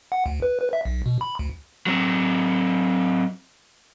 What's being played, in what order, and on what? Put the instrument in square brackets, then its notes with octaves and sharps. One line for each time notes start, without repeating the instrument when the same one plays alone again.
[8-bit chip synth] F#5
D2
B4
B4
E5
B1
B2
B5
D2
[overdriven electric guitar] F#3 C4